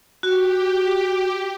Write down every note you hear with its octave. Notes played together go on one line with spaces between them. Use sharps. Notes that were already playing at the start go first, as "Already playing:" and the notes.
F#4 G4